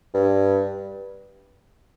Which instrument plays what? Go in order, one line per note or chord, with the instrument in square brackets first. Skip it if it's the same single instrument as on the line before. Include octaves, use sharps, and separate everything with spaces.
[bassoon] G2